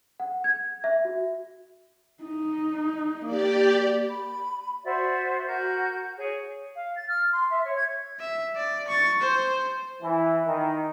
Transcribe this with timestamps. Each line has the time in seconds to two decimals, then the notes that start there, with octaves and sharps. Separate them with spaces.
0.20 F#5
0.44 G#6
0.84 E5
1.05 F#4
2.24 D#4
3.25 A#3 G4 D5
4.07 B5
4.84 F#4 C5 D5 E5
5.46 F#4 A#4 G6
6.18 G#4 C#5
6.75 F5
6.96 A6
7.08 F6
7.32 C6
7.50 E5
7.65 C#5
7.76 G#6
8.20 E5
8.56 D5
8.88 C#6 A6
9.21 C5
10.01 E3
10.46 D#3